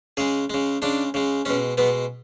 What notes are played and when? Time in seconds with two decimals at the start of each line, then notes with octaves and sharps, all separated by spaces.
0.17 C#3 G#3 G#4
0.50 C#3 G#3
0.82 C#3 G#3 D4
1.14 C#3 G#3
1.45 B2 G#3 C#4
1.78 B2 G#3 B3